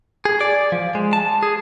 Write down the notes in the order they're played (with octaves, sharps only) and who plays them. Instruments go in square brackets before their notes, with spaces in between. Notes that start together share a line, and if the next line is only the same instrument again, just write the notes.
[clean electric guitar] G#4
D5
F3
G#3
A5
G#4